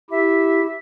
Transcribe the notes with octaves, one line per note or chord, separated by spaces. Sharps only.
E4 G4 E5